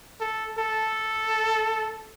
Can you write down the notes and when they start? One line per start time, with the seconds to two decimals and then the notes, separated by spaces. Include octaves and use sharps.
0.21 A4
0.58 A4